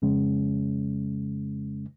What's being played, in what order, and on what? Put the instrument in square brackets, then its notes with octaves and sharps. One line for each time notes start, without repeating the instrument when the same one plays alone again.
[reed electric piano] F2 C#3 G#3 C#4